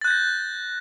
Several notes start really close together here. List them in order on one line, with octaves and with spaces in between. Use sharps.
A6 F#6 G6 A#6